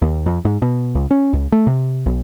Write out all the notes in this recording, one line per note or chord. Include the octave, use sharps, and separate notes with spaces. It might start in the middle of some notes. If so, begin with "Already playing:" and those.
D#2
F2
G#2
B2
C#2
C#4
C#2
A3
C3
B1